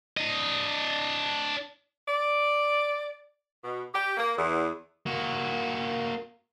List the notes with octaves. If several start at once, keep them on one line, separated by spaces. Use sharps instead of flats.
D4 D#5
D5
B2
G4
A#3
E2
A#3 F#4